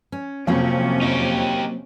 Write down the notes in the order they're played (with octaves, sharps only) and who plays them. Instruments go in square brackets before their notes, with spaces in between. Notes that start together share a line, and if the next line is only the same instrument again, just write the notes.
[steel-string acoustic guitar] C#4
[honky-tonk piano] F2 [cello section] C3 C#4 [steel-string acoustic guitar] F#3 A#3 C4
[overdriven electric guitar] D#4 G4